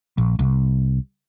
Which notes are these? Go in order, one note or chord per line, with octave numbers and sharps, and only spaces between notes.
A#1
C2